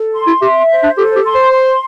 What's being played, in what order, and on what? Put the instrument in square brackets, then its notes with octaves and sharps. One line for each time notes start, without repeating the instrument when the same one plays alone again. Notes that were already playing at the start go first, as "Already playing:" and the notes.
Already playing: [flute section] A4
C6
[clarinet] E4
[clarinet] G4 [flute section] E5
[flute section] C5
[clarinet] D4
[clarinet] G4 [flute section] A4
[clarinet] G4
[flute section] C6
[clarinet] C5
[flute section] C6